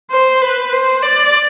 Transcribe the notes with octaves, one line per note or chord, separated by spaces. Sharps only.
C5
B4
C5
D5